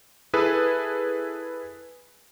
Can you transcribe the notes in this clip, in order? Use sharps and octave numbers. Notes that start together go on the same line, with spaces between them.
E4 G#4 A4 B4